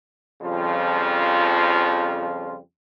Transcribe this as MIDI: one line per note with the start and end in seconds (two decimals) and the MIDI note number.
0.42 2.59 41
0.42 2.59 49
0.42 2.59 53
0.42 2.59 55
0.42 2.59 65